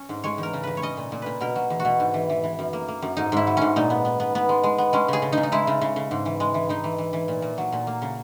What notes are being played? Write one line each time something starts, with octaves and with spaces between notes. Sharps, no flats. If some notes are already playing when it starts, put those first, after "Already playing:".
Already playing: C#4
G#2
G#3 C#5
E2 A#4
C#3
E2 B4
C#5
C#4 D#5
A#2
A#2
A#2 B4
B2 A#4
F#3
E2
F#4
B2
G#2
E3
E3
E3
F#2
A#3
A#3
F#2
G#2 D#4
G#2 E4
F#3
G#2 C#4
A#2 D#4
B3
B3
B3
B3
G#3
G#3
B3
G#3 C#4
C#3 G#4
C#3
D#4
C#3
D#4
G#3 E4
C#3
C#3
C#3
G#2
E3
G#3
E3
E3 D#4
E3
E3
E3
A#2
A#2
F#3
A#2
A#3
C#3